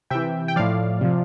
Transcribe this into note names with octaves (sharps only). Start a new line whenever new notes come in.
C3 E3 E5 G5
G5
A2 F3 D5 F5
C3 F3